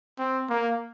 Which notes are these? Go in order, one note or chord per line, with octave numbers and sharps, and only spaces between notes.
C4
A#3